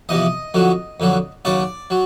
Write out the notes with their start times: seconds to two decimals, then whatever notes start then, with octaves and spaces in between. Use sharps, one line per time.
0.09 E2 C3 F3 D#5
0.54 F2 D3 F#3
1.00 F2 D3 F#3
1.45 D#2 C#3 F#3 D5
1.90 F#3